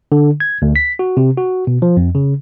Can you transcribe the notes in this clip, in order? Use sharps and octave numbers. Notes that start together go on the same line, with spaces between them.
D3
G#6
D2
B6
F#4
C3
F#4
B2
F3
F2
C#3